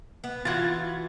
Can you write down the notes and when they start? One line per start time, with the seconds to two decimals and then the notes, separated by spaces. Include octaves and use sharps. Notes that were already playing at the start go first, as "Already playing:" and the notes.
0.24 B3
0.45 E3 F4 F#4 G#6 A6